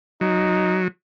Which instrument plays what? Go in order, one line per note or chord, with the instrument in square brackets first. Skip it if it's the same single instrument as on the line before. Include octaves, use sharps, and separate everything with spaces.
[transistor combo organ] F#3 [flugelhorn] D#4